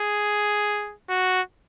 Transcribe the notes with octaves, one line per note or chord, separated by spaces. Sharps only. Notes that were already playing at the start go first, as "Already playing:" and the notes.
Already playing: G#4
F#4